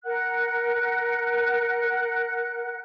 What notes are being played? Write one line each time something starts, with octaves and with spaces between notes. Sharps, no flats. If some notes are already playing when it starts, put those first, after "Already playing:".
A#4 F#5 F#6